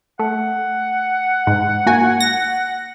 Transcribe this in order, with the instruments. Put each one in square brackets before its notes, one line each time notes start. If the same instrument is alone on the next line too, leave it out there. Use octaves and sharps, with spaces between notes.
[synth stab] A3 [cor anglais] F#5
[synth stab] G#2
A#3 F#4 G#5
A#6